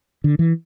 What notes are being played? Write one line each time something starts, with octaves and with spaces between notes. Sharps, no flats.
D3
E3